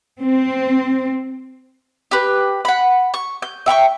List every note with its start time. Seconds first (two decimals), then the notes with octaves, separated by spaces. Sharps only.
0.22 C4
2.11 G4 B4
2.65 F#5 B5
3.14 C#6
3.42 G6
3.66 E5 G5 A#5 C#6